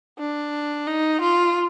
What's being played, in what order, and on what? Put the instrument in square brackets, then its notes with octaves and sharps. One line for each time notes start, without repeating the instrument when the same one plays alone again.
[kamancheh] D4
D#4
F4